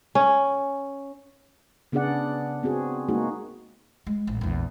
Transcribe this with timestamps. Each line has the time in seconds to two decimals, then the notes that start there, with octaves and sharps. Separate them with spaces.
0.15 C#4
1.92 C#3 B3 D4 G#4 D5 F#5
2.63 B3 C4 F#4 G#4
3.09 G#3 A#3 D#4 F#4 G#4
4.07 G#3
4.27 A1
4.41 A#1 E2